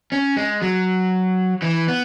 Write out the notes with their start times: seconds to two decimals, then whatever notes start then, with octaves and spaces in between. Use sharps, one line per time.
0.12 C#4
0.36 G#3
0.62 F#3
1.62 E3
1.88 B3